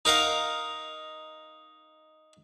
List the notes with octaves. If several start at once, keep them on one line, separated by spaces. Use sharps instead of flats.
D#4 A#4 F5 F#5